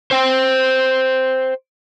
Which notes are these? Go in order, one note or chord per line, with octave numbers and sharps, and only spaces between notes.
C5 G5